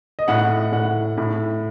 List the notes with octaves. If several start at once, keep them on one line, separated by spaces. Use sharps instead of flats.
D#5
A2 F#5
A2 F#5
A2